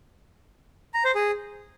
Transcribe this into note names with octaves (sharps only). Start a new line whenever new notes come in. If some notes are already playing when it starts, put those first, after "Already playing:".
A#5
C5
G#4